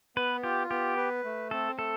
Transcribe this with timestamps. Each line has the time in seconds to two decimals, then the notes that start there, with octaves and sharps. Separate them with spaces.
0.16 B3 B4
0.43 F4 G4
0.70 B3 G4
0.97 B4
1.24 A3
1.51 C4 A4
1.78 A3 A4